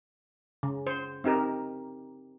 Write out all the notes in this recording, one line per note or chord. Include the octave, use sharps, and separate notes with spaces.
C#3
C5
C4 D#4 G4 A#4